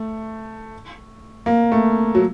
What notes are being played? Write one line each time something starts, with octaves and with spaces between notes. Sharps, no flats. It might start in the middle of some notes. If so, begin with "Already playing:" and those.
Already playing: A3
A#3
A3
F#3